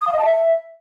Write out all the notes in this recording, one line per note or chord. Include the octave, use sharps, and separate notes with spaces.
D#6
F5
D#5
A5
E5